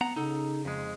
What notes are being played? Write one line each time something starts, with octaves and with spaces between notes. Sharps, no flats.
B3 F#5 A#5
C#3 D#4 A4
F2 G#3